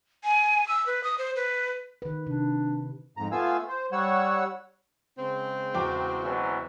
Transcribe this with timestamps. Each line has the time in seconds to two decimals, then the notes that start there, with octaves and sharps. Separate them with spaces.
0.24 G#5
0.68 E6
0.86 B4
1.04 D#6
1.18 C5
1.36 B4
2.02 D#3 B4
2.27 C3 D4
3.17 F2 G#2 A#5
3.32 A3 B3 F4 F5 G#5 E6
3.68 C5
3.92 G3 C#5 F#5 E6
5.18 C#3 G#3 C4
5.75 E2 F#4 G5 D6
6.23 B2 E3 F#3